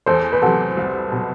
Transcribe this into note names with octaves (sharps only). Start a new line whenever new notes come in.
E2 A4 C5
B4
C3 F#3 F#4 A4
C2
B2 F#3